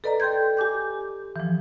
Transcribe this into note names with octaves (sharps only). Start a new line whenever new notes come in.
A4 B4 D5 D#5 A#5
A4 G5 C6 G6 G#6
G4 G#5 D6 G6
E3 F3